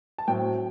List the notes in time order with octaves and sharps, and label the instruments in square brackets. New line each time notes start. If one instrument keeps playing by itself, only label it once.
[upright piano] A5
A2 F#3 C4 G5